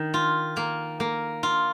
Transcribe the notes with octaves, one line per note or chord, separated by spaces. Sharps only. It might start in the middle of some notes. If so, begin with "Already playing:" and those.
Already playing: D#3
F4
A#3
A#3
F4